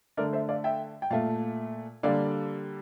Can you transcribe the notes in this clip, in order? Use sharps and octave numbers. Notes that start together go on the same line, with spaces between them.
D3 A3 A#4 D5
C5 E5
D5 F5
E5 G5
G5
A#2 A3 F5 A5
D3 G3 A#3 D5 F5